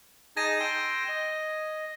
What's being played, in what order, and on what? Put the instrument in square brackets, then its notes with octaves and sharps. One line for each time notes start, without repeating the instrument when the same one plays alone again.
[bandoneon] D#4 G#4 A5 [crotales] G#6 A#6 D#7
[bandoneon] G5 C6 E6
D#5